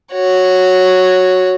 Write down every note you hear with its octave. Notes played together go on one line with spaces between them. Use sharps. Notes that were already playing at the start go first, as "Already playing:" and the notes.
F#4 C#5